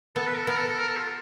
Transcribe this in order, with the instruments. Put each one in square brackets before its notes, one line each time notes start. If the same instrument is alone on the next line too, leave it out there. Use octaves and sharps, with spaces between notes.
[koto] B3 [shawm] A4
[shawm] B4
A4
[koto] B3 [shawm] A#4
[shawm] A4
A4
A#4
A4
F4